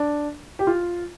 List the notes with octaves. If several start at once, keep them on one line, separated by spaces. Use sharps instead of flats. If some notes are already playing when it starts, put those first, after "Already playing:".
Already playing: D4
G4
F4